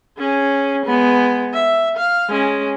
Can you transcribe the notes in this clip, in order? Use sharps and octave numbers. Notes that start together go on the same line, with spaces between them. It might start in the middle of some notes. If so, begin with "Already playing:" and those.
C#4 G#4
G#3 B3
E5
F5
G#3 C#4